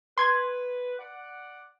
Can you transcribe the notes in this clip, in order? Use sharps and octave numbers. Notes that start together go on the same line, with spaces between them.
B4 C6 G#6
D5 F#5